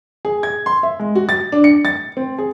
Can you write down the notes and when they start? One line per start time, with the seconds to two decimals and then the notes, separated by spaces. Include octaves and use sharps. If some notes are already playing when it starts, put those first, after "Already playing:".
0.25 G#4
0.43 G#6
0.66 C6
0.83 E5
1.00 G#3
1.15 F#4
1.29 A6
1.52 D4
1.64 C#7
1.85 A6
2.17 C4
2.38 G#4